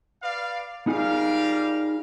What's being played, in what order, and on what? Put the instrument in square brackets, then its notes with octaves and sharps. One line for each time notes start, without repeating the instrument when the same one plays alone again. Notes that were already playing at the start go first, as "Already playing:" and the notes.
[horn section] B4 D5 F5
[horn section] G3 A#4 F5 [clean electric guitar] D#4 F4 G#4